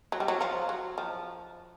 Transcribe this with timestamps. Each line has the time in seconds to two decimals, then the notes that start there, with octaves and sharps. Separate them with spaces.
0.12 F#3
0.20 G3
0.28 F#3
0.41 F3
0.69 F#3
0.98 F3